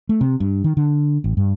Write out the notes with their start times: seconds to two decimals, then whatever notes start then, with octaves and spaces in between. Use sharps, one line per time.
0.09 A3
0.21 C3
0.40 G2
0.64 D#3
0.77 D3
1.24 A1
1.37 G2